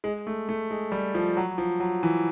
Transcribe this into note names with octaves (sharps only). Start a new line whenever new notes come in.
G#3
A3
A3
G#3
G3
F3
F#3
F3
F#3
E3